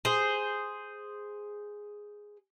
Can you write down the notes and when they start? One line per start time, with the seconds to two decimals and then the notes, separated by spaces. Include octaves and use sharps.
0.05 G#4 C5